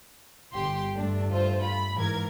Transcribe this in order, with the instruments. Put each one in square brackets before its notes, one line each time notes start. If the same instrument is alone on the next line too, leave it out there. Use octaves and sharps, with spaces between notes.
[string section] G1 G4 C6
[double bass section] G2 A3 [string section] D4
[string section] F4 C5
B5
[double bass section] G#2 [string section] E3 A#4 G#6